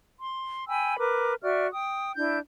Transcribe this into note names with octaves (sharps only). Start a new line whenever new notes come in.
C6
G5 G#5 B5 E6
A#4 B4 D6
F#4 D5 E5 F6
G5 D#6
D4 E4 G6